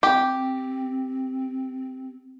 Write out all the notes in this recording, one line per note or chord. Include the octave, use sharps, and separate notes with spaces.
C4 G4